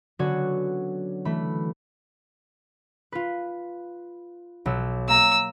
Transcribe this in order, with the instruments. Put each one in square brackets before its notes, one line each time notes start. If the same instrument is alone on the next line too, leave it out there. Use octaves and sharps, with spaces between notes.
[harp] D3 F#3 B3 C#4 F#4 C#5
E3 A3 B5
F4 B4
B1 B3 E6
[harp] A#3 A#5 [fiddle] E6